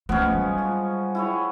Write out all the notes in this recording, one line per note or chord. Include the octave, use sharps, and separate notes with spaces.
F3 G#3 A3 B3 C#4
F#3 G3
F3
E4 G#4 C#5